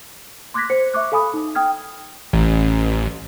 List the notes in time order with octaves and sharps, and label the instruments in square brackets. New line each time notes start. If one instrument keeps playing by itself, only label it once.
[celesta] C6 D6 F#6 G#6 A#6 B6
C5 C#7
E5 C#6 D6 F#6
A4 F5 G#5 B5 D#6
D#4
G5 D#6 F6 G#6
[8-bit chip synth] A1